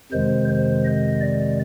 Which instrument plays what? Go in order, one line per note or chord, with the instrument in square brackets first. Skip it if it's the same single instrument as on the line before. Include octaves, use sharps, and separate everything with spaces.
[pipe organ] F2 C3 D#3 G#3 C5
C5
D#5
D5